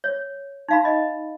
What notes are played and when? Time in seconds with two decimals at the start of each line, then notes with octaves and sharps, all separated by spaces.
0.04 C#5
0.68 D#4 F5 B5
0.85 D#5